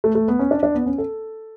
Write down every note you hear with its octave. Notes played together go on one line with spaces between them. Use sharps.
A3
A3
B3
C#4
D4
D4
B3
C#4
A4